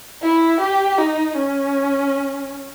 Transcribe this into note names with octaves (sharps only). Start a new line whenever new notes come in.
E4
G4
D#4
C#4